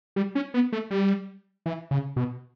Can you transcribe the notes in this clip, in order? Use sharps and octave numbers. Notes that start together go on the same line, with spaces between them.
G3
C#4
B3
A3
G3
E3
C#3
B2